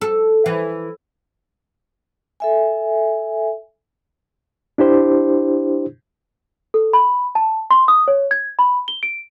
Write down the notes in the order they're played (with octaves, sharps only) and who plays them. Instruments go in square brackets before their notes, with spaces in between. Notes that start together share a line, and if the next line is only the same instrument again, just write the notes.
[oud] A4
E3
[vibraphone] A4 E5 G#5
[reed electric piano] D4 E4 G4 C5
[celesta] A4
B5
A5
C6
D#6
C#5
G#6
B5
G7
D7